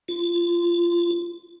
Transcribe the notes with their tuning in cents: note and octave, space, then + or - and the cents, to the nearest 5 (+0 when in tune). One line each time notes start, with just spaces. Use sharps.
F4 -20